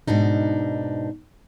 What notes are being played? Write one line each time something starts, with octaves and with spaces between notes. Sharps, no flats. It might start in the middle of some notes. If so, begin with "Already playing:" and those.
G#2 B2 D4 D#4